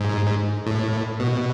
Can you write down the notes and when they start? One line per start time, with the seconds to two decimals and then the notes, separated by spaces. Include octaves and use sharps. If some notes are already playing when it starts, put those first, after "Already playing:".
Already playing: G#2
0.66 A2
1.19 B2